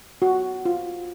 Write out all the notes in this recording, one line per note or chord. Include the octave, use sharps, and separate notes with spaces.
F#4
F4